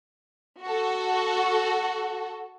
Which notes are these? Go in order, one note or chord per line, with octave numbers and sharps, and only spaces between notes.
F#4 A4